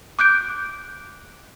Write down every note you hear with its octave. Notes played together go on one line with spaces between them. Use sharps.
D6 F#6 G6 D7